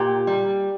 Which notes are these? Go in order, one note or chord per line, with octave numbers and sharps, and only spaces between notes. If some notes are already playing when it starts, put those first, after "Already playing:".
Already playing: A#2 G4
G3